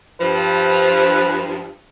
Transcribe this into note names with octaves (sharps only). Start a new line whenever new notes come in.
G2 F3 B4